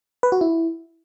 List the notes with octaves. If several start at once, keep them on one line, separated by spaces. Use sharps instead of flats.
B4
F#4
E4